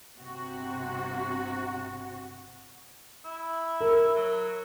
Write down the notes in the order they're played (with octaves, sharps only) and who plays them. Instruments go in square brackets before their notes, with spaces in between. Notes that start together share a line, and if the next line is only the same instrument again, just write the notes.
[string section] G1 C3 F#4
[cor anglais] E4
[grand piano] A#4
[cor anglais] F#3